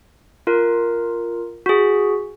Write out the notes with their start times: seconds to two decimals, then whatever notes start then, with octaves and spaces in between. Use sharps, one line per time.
0.47 F4 A#4
1.66 F#4 G#4